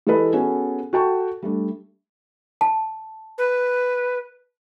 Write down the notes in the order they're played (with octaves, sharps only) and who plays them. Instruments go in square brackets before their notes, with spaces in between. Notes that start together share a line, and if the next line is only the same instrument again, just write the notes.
[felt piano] E3 G#3 G4 A4 B4 D#5
B3 C#4 F#4 G#4 A4
F#4 A4 G5 A5 C#6
G3 A3 D4
[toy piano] A5
[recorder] B4